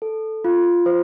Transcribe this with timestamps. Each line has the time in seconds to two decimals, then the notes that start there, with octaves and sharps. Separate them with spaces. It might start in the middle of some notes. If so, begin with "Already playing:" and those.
0.02 A4
0.45 F4
0.86 C5